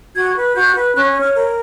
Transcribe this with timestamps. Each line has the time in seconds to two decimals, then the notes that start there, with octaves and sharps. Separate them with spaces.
0.16 F#4 G#6
0.36 B4
0.55 F#4 G6
0.75 B4
0.94 C#4 F#6
1.15 C#5
1.21 F6
1.34 A#4